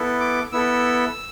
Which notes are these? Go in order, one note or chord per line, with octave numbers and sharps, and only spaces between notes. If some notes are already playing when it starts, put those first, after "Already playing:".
Already playing: B3 E4 A4
D6
B3 E4 A4 E6